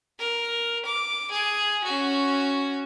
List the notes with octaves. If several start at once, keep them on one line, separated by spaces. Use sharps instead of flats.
A#4
D6
G#4
C#4 F#4